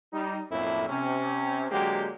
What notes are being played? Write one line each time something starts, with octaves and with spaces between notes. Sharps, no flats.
G3 D#4
B1 F2 A2 A#3 D4 E4
C3 C#4
D3 F#3 G#3 A#3 G4